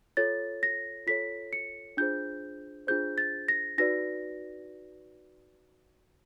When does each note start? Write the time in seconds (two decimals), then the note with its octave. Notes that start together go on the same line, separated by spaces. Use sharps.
0.17 F4 A4 C#5 A6
0.63 A#6
1.07 F4 A4 C#5 B6
1.53 C#7
1.97 D4 F4 G#4 C5 G6
2.87 D4 F4 G#4 C5 G6
3.18 A6
3.48 A#6
3.78 D#4 F#4 B4 D5 A#6